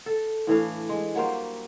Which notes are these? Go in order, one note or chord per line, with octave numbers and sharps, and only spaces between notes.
A4
A2 E3 D4 F5
G#3
F#3 G3 A#3 C5